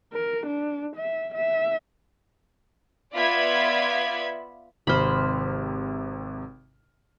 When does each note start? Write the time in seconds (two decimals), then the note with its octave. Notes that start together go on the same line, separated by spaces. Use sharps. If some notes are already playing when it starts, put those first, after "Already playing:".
0.13 A#4
0.46 D4
0.96 E5
1.34 E5
3.14 B3 F4 D5 E5 B5 G#6
4.87 G#1 C3 C5 B5 F6